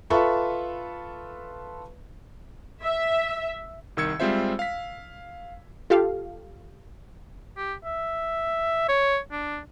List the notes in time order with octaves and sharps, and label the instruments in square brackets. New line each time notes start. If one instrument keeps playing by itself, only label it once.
[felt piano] F4 A4 B4 E5 B5 C#6
[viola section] E5
[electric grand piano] C2 D#3 E6 G#6 C#7
G3 G#3 C4 F4 C5 E5
F5 B6
[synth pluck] F4 G4 A4 F5
[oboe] G4
E5
C#5
D4